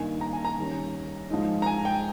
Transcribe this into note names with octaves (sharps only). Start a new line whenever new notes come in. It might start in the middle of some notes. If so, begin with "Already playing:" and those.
Already playing: G2 D#3 A#3 D#4 G#5
A#5
G#5
A#5
D#3 G3 C#4
G#2 F3 G#3 D#4
A#5
G#5
G5